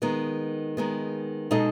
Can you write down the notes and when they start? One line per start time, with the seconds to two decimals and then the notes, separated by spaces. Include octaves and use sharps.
0.02 D#3 G#3 B3
0.77 D#3 G#3 B3
1.51 B2 G#3 D#4 A4 D#5